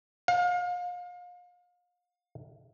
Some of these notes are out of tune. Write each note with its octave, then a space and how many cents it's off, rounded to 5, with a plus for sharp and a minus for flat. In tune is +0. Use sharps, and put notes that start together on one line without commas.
F5 +35